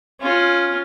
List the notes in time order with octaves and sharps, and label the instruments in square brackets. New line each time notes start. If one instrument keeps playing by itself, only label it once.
[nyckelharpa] C#4 F4